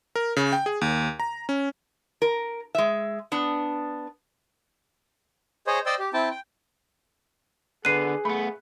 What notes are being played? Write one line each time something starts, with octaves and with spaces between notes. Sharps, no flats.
A#4
C#3
G5
G#4
D#2
A#5
C#4
A#4
G#3 E5
B3 D4
G#4 C5 C#5 D#5
C5 D5 D#5 G5 C6 E6
G4
C4 E4 G5 A5
G5
D3 B3 G#4 B4 F#6 C7 D#7
A3 B3 B5